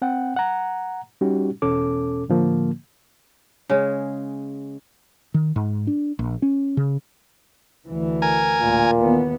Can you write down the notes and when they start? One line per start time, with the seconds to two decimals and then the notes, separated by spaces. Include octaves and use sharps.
0.02 C4 F#5 G5
0.36 F#5 A#5
1.21 G3 C#4 D#4 F#4 G4
1.62 E2 B2 C#4 A4 D6
2.28 A2 D3 F3 A#3
3.69 C#3 G#3
5.34 D#3
5.56 G#2
5.87 D4
6.19 A#1
6.42 C#4
6.77 C#3
7.88 D2 E3
8.22 A#4 G#5
8.61 A1 D2 A#2
8.98 D#2 E3 B3